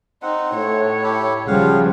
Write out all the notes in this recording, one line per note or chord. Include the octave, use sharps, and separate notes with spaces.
C4 D#4 F#5
A2 C#5
G4 A4 B5
C#3 F3 G3 F5 F#5